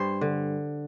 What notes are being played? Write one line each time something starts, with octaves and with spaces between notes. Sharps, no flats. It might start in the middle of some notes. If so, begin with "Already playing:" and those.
Already playing: G2 C5
D3